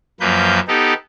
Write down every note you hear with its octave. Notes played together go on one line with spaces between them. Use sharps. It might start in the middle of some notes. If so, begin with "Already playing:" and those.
F#2 F3 A#3 B4 G6
B3 D#4 G4 A4